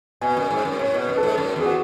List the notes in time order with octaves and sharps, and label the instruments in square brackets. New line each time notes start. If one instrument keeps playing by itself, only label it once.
[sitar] B2 [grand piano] G#5
[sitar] F#2
G#2
F#2
[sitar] A2 [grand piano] C#5
[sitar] B2 [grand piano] B4
[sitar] F#2
[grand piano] A4
[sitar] G#2
F#2
[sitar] E2 [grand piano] G#4
[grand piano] F#4